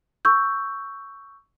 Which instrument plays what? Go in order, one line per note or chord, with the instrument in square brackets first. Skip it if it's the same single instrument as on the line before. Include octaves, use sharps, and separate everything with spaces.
[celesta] C#6 E6 G6